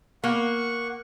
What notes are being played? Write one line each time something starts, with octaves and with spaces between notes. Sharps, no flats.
A#3 F#5 C#6